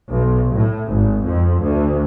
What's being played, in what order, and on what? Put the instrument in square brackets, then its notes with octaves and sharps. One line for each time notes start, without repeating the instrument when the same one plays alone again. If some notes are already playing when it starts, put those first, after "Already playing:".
[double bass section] B1
A2
G#1
F2
D2